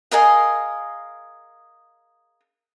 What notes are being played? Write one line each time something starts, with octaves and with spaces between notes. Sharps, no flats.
G#4 A#4 D#5 F5